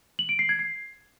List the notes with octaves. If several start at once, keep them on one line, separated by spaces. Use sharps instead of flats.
F#7
D7
C7
G#6
C7